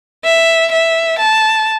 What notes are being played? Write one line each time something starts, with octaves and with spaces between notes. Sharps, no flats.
E5
E5
A5